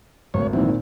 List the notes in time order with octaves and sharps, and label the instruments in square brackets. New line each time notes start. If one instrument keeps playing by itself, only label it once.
[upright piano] G#1 D2 [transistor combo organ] C#5
[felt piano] A#2 D#3 C4 [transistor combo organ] E3 F#3